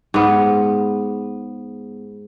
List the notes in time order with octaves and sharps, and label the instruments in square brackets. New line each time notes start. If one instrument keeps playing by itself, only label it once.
[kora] G#2 B3